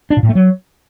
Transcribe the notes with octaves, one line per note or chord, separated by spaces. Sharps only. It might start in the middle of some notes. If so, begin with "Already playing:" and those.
D4
A#2
A2
A3
F#3